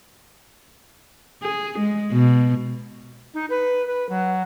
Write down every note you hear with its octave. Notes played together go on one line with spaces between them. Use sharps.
G#4
G#3
B2
D#4
B4
B4
F#3